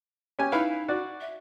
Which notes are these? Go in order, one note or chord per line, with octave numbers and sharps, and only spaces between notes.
C#4 G4 G#5
D#4 E4 B4 F5
F#4 D5
E5